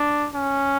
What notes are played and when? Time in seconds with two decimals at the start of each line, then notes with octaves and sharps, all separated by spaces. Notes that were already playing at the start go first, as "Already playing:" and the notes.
Already playing: D4
0.34 C#4